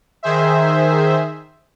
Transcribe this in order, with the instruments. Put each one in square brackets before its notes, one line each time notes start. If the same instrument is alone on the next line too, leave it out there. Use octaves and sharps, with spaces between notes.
[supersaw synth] D#3 G#4 C5 E5